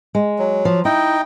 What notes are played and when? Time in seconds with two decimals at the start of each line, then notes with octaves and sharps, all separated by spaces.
0.15 G#3
0.39 F#3
0.65 F3
0.85 D#4 E4 D#5 G5